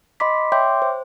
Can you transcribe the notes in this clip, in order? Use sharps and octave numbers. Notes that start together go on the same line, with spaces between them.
D#5 B5 C6 D6 B6
C#5 E5 G5 C6 D6 G6
C5